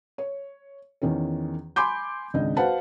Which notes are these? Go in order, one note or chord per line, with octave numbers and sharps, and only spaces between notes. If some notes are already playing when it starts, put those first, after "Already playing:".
C#5
E2 D#3 C#4
G#5 B5 C6 D6 G6
G#1 C#2 D4 D#5
F#4 B4 C5 F5 F#5 A5